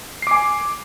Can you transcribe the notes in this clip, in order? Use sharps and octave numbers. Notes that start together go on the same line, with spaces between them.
G#5 D6 C7